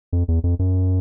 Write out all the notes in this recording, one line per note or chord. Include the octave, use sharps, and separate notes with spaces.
F2
E2
F2
F#2